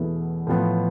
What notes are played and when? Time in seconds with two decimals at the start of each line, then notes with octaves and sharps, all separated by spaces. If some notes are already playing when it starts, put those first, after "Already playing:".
Already playing: E2 B2 E3 A3 E4
0.47 A2 F3 B3